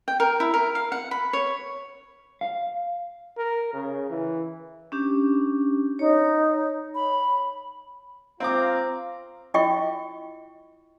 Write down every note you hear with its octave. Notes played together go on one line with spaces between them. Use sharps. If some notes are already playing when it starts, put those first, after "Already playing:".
G5
A#4
E4
A#4
F5
F#5
B5
C#5
F5
A#4
C#3
E3
C#4 D4 G4
D#4 C#5
B5
C4 F4 F5 A#5 D6
E4 F4 D#5 G5 C#6